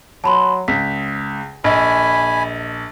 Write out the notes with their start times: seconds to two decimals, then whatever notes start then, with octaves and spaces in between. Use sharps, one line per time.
0.24 F#3 A5 B5 C6
0.68 C#2 B6
1.64 A#1 D#5 G#5 B5